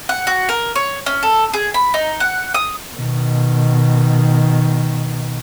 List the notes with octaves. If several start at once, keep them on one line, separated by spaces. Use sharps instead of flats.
F#5
F#4
A#4
C#5
C#4
A4
G#4
B5
D#4
F#5
D#6
B2 D#3